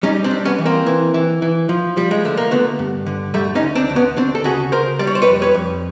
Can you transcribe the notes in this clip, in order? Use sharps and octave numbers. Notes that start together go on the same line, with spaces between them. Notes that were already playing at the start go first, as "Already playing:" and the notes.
G3 C#4 D#4
C4 D4
G3
B3 C#4
E3
A#3 C4
E3
E3
E3
F3
F3 G3
G#3
D3 A3
A#3
D3 A3 B3
G2
D3
D2 G3 A3
C#4 D#4
D2
C4 D4
D2
B3 C#4
D2 C4 D4
A4
C#3 F#4 G#4
C#3 A#4 C5
G3 D5
C#5
C5
B4 C#5
F2
B4 C#5
F2